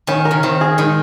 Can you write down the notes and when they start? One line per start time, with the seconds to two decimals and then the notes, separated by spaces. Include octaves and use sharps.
0.07 D#3 C#4
0.25 A#4
0.31 C#3
0.43 D#3 C4
0.61 G#4
0.78 D#3 G#3